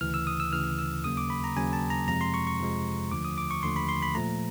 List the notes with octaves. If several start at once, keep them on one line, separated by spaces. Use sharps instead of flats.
D2 C#3 E3 F6
E6
D#6
E6
D2 C#3 E3 F6
E6
D#2 C#3 F#3 A#3 D#6
D6
B5
A#5
D#2 C#3 F#3 A#3 G#5
A5
A#5
F2 C3 F3 G#3 A#5
C6
C#6
C#6
F2 C3 F3 G#3
D#2 D3 F3 A3 D6
D#6
D6
C#6
D#2 D3 F3 A3 C6
B5
C6
B5
A#2 F3 A3 A#5